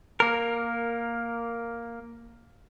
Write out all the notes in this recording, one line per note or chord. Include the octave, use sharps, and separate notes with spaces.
A#3 A#4